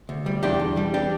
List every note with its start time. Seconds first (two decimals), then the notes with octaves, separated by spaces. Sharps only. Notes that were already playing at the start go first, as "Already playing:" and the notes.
0.09 D2
0.26 G3
0.43 E2 D4 G4
0.60 E2
0.77 G3
0.94 D4 G4